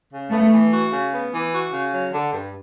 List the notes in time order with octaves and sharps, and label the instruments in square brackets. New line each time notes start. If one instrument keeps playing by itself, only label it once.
[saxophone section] C#3
[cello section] A3 [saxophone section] B3
[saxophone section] E3
F#4
C#3
B3
E3
F#4
C#3
F#3
D3
G2